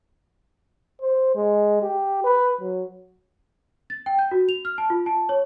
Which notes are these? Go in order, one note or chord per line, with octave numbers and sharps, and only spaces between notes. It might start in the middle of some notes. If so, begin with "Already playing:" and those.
C5
G#3
G4
B4
F#3
A6
G5
G6
F#4
F7
F6
A5
F4
A5
C#5